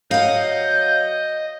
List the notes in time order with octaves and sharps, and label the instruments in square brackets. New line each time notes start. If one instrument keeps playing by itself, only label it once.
[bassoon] F#3 [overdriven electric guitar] D#5 [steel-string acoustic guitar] F5 F#5 [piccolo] G6